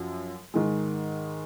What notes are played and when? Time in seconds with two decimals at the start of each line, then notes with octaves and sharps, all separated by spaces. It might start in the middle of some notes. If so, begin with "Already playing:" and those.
Already playing: F#2 F3
0.54 G#2 D#3 G#3